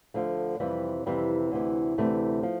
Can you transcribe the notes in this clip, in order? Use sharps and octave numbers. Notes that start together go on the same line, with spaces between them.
D2 D3 F3 A3
F2 C3 E3 G3
F2 C3 E3 G3
D2 C3 E3
D2 C3 E3 A3
F3